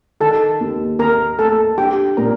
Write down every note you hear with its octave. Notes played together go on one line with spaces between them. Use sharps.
D#3 A4 A5
D#2
D#2 A#4 A#5
A3 A4 A5
D4 G4 G5
A#2 A#4 A#5